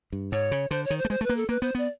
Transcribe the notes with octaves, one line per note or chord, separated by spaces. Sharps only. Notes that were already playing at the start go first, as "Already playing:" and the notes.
G2
G#2 C#5
C#3
D3 C5
C#5
D#3
C5
A3
G#3 C5
A3 B4
A#3
A4
A#3 B4
B3 C5
B3 D5